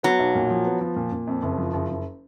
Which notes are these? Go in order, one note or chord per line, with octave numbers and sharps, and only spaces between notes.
F#3 B3
B1
A#2
F3
B3
F3
A#2
A#2
F2
F#1
F3
F#1
F#1